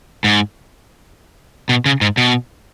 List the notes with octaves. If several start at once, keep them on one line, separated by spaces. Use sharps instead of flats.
G#2
B2
C#3
G#2
B2